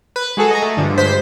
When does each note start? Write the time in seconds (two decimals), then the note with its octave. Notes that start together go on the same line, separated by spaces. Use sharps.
0.16 B4
0.37 G#3 F#4 G#4 A4
0.51 D#5 G#5 A#5
0.62 A3
0.77 G2 D3 F3
0.97 G2 G#3 C5 B6